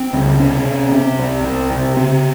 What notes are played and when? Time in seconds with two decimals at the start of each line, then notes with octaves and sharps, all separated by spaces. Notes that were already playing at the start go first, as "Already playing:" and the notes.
Already playing: C4
0.13 C#2
0.39 C3 C#4
0.65 C3
0.91 C3 C4
1.18 C2
1.44 C2
1.70 C3
1.96 C#3 C4